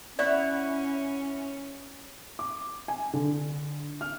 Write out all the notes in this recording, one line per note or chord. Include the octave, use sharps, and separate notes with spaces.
C#4 E4 C#5 D5 F#5
D6
G#5
D3
F6